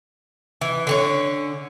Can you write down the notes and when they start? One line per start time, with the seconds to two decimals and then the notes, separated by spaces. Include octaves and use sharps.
0.61 E3
0.87 D3 C4 C#4